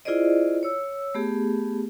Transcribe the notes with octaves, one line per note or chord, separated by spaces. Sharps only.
E4 F4 G#4 C5 D5 D#5
C#5 E6
A3 B3 G4 G#4